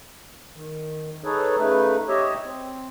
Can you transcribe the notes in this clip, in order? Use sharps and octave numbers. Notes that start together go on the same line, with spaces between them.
D#3
D#4 G#4 A4 B4 C#5
C#3 A3 D#4 B4
G4 C#5 D#5 E5
C4